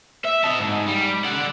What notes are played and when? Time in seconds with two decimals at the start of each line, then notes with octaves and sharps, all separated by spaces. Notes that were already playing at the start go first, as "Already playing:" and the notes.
0.25 E5
0.44 D#5 A5
0.59 G#2
0.87 G3
1.25 D5 F#5